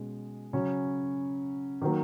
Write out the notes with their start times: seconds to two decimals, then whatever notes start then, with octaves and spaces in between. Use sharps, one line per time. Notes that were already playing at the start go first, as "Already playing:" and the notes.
Already playing: B2 G#3 C#4
0.53 C#3 F#3 C#4
1.82 D#3 F#3 A#3